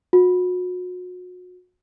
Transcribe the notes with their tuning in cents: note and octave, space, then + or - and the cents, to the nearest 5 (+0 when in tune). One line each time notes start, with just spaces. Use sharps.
F#4 -35